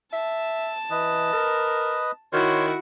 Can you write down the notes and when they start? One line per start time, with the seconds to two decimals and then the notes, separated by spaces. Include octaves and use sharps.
0.13 E5 A5
0.90 E3 B4 D#5
1.33 A#4
2.33 D#3 E4 F#4 C#5 C6